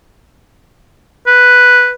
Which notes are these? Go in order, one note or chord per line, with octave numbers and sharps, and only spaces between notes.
B4